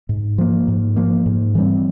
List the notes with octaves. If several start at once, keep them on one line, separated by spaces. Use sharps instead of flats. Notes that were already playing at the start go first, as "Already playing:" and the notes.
G#2
F3 A#3
G#2
F3 A#3
G#2
E3 G3 C4